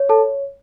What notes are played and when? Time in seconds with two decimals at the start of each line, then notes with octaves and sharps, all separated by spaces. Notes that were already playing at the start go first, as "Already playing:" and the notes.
Already playing: C#5
0.09 A4 A5